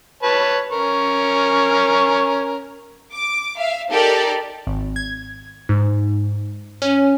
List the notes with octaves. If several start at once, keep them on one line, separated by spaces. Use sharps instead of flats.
B4 C#5 A5
C#4 A#4 C#6
D6
E5 F5
D#4 G4 A4 A#4 D5
G#1
G#6
G#2
C#4